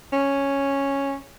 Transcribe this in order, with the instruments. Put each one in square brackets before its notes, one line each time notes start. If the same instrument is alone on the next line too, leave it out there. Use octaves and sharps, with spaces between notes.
[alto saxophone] C#4